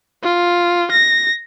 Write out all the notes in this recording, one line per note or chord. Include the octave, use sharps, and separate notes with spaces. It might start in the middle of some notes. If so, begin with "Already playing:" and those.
F4
A#6